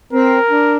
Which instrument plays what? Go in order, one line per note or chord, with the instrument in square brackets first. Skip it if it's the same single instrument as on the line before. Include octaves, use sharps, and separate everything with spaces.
[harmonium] C4 [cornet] A#4
[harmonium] D4